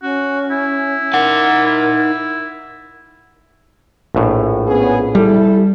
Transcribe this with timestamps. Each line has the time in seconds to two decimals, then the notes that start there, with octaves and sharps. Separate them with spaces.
0.02 C#4 F#4
0.51 E4
1.14 D#4 A#4 F#5
1.66 E4
4.15 A#1 A2
4.68 B3 C#4 G#4
5.15 G3 E4 A4